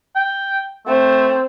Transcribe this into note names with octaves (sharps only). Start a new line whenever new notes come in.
G5
A3 C4